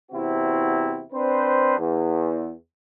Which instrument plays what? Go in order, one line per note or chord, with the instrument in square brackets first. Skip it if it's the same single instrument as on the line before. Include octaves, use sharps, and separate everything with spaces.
[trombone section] E2 C3 C4 E4 F#4
C4 D4 B4 C5
E2